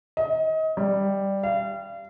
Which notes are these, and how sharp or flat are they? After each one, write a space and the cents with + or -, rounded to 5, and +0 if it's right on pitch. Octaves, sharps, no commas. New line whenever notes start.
D#5 +30
G3 +0
F5 -35